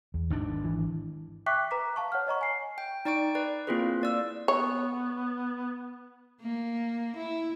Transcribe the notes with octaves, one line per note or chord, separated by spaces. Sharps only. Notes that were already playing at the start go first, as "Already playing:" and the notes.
E2
G#1 D#3 D4
E3
E5 G5 C#6 D6 F#6 B6
B4 A#5 D6 B6
F5 A5 C#6
C#5 F#5 F6
C#5 D#5 A#5 C#6
G#5 C7
G5
D#4 D5 G5 C#6 D7
B4 D5
A#3 C4 E4 F4 G#4 B4
A#3 D5 E6
B3 C#5
A#3
E4